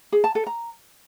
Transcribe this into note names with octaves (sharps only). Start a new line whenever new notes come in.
G#4
A5
A4
A#5